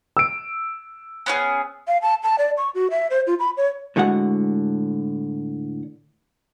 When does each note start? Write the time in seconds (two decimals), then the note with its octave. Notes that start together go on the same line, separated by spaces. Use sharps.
0.17 E6 D7
1.26 B3 C#4 G#4
1.88 F5
2.02 A5
2.23 A5
2.38 D5
2.58 C#6
2.75 F#4
2.91 E5
3.10 C5
3.27 F4
3.39 B5
3.57 C#5
3.96 A2 D3 G#3 F#4 F#5